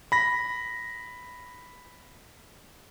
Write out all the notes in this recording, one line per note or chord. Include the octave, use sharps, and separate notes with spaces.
B5 A#6